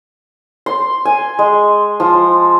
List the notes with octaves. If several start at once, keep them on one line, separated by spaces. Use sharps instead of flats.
C6
G#5
G#3
F3